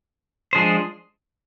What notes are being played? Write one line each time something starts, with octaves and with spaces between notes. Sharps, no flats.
F3 G#3 D4 G#4 C5